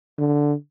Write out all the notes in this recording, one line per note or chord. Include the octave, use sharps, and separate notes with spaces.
D3